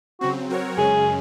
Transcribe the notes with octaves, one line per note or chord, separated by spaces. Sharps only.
C#3 F#3 C4 F#4
F#3 C4 F#4 A#4 C#5
F#2 C#3 G#3 C#4 G#4